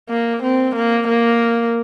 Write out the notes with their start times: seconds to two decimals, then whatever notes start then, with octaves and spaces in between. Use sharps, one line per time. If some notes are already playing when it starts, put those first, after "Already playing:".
0.09 A#3
0.43 C4
0.75 A#3
1.08 A#3